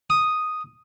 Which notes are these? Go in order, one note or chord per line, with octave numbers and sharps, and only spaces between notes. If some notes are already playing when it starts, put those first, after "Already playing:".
D#6